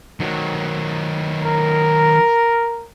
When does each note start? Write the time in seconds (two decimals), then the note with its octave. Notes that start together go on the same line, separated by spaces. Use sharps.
0.20 D#3 F#3
1.42 A#4